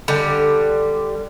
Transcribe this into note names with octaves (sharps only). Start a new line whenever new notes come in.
D3 G3